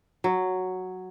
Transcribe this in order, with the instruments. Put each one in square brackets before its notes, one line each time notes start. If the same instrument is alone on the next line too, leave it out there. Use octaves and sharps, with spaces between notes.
[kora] F#3